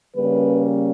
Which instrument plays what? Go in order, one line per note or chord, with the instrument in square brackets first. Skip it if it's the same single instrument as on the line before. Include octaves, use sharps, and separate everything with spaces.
[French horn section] C#3 G3 A#3 C#4 B4